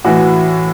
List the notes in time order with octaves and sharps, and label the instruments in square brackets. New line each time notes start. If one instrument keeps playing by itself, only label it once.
[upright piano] A2 E3 F#4